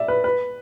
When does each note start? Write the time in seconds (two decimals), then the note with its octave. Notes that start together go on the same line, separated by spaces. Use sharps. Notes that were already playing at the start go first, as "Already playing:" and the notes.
Already playing: D5 E5
0.08 B4
0.24 B4